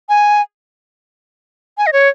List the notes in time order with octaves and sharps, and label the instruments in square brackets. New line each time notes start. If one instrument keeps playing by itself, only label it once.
[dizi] G#5
G#5
D#5
C#5